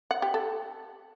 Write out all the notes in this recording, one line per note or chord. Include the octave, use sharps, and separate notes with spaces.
F#5
G4
A4